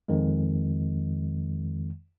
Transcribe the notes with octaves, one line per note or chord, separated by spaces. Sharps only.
F2 D#3 G#3